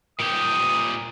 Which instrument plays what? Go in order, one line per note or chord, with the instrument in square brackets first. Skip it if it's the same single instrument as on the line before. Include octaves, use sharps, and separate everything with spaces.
[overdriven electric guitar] A#2 G4 [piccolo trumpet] D#6